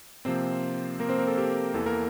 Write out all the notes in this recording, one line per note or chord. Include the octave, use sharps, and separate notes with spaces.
C3 F3 A#3 C4 C5
A#3 A#4
C4 C5
A#3 A#4
A4
G4
E2 E3 A#3 A4
A#3 A#4